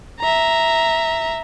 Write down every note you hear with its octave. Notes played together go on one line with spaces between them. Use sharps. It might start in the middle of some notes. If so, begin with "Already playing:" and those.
E5 A#5